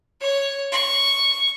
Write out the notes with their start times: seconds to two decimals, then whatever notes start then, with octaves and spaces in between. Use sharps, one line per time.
0.20 C#5
0.72 C#6